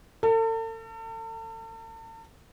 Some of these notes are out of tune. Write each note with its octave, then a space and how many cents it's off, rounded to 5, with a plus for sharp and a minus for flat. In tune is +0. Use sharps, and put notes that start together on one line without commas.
A4 +40